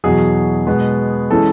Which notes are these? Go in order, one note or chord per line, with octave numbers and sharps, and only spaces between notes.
E2 B2 F#3 G#4
B2 G#3 B3
E3 G#3 C#4 A4